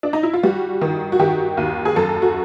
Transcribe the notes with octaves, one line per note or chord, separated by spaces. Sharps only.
D4
D#4
E4
F4
G3 F#4
D#3
F#4
D#3 G4
D#2
G#4
F#2 A4
F#4